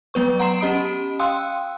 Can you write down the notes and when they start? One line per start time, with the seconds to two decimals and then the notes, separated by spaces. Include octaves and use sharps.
0.14 F#3 B3 B4 C#6
0.40 F#5 A#5 C6 C7 E7
0.60 C#4 G4 D#5 B5 D#6 D7
1.19 F5 G5 C6 D#6 E6 F#6